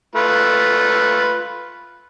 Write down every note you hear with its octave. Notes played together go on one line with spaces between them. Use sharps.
A3 F4 B4